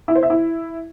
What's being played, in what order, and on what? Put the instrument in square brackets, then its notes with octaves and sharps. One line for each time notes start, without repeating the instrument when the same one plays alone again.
[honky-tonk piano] E4
C5
E5
E4